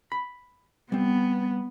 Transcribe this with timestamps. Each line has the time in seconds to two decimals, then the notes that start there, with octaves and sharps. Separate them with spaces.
0.12 B5
0.92 G3 B3 C4